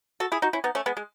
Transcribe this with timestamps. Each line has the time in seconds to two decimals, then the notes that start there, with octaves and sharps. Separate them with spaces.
0.20 F#4 A4
0.32 E4 G#4
0.42 D#4 F#4
0.53 C#4 E4
0.64 B3 D#4
0.75 A3 C#4
0.86 G#3 B3
0.97 G#3